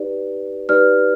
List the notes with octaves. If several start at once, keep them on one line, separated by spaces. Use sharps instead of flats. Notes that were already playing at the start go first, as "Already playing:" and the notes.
Already playing: D#4 G4 B4 D5
D#4 G4 B4 D5 F6